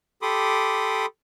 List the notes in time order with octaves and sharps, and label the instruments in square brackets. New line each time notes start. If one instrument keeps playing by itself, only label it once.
[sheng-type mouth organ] G4 A4 B5 C6 D6 D#6